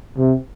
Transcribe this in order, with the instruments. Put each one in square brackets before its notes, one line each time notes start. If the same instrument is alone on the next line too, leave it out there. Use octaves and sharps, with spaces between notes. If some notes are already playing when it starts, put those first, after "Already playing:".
[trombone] C3